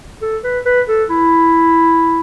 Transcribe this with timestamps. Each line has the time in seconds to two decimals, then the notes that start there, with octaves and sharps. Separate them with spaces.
0.22 A4
0.44 B4
0.66 B4
0.89 A4
1.10 E4